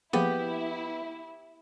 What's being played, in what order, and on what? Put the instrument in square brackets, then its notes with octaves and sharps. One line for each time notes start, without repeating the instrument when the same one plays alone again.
[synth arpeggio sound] F3 A#3 G#4 [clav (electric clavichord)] B3 [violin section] E4 [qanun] G4